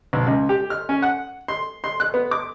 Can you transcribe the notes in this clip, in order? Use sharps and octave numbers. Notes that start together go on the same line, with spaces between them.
B1
C#2
G4
F6
C#4
F#5
C6
C6
F#6
B3
D6